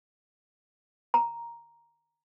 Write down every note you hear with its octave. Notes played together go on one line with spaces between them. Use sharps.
A#5